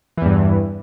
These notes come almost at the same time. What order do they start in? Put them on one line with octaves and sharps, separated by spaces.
E3 E2 G2